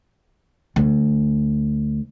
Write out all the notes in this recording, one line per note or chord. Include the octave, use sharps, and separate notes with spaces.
D2